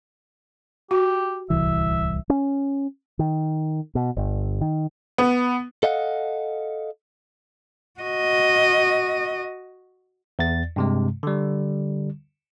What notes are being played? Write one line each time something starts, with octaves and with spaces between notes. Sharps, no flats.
F#4 G4
D1 C2 E3 E5
C#4
D#3
B2
G1
D#3
B3
A4 D#5 F5 F#5
F#4 D#5
E2 A6
G2 C3 G#3
D3 G3